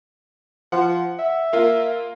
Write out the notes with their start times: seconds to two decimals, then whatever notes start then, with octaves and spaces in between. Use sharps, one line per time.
0.72 F3 F#5
1.19 E5
1.53 A#3 F4 A#4